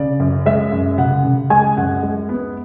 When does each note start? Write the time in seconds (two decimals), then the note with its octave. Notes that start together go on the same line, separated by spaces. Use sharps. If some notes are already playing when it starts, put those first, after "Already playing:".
Already playing: C#3 D5
0.20 F#2
0.46 G#3 E5
0.72 F#2
0.98 C#3 F#5
1.24 C#3
1.50 G#3 G#5
1.77 F#2 F#5
2.03 G#3
2.29 B3